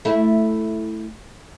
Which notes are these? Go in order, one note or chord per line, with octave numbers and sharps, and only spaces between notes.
A3 E4